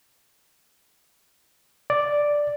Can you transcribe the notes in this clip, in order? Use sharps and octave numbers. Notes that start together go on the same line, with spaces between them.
D5